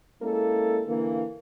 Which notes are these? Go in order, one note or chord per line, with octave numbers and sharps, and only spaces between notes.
G#3 A#3 C#4 E4 A4
D3 E3 A#3